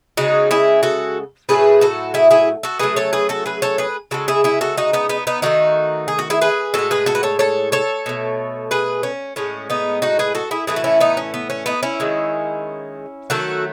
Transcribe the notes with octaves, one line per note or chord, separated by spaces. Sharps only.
C#3 G#3 D#4 F#4
E4 G#4
F#4 A4
A2 F#3 A3 G#4 B4
F#4 A4
E4 G#4
E4 G#4
F#4 A4
C#3 F#3 A3 G#4 B4
A4 C#5
G#4 B4
F#4 A4
G#4 B4
A4 C#5
G#4 B4
C#3 G#3 F#4 A4
E4 G#4
E4 G#4
F#4 A4
D#4 F#4
B3 D#4
B3 D#4
B3 D#4
D#3 F#3 A3 D#4 F#4
G#4
F#4
E4 G#4
G#4 B4
A2 G#3 F#4 A4
G#4 B4
F#4 A4
B4
A4 C#5
A4 C#5
A4 C#5
B2 A3
G#4 B4
C#4
A2 G#3 C#4
B3 D#4
D#4 F#4
G#4 B4
F#4 A4
E4 G#4
A2 E3 A3 E4 G#4
F#4
C#4 E4
B3 D#4
C#4
B3
C#4
B3 D#4
C#4 E4
D#3 G#3
D#3 F#3 A3 F#4 A4